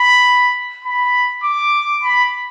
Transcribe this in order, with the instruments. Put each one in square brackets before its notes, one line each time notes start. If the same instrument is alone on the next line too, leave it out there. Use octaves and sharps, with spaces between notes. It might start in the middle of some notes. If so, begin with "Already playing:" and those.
Already playing: [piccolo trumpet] B5
B5
D6
B5